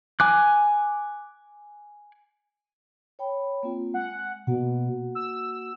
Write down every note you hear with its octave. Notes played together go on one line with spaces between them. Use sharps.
G#5 D6 F#6
C#5 G5 B5
A#3 C4 F4
G#3 F#5
B2 A#3 F#4 F#5
E6